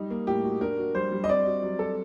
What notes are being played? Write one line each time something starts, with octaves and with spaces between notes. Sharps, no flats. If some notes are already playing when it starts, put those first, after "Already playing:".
Already playing: G3 D#4
A#3
A2 G4
F#4
D4 A#4
F#4
G3 C5
G3
D#5
C4 D5
F#4
F#3
A4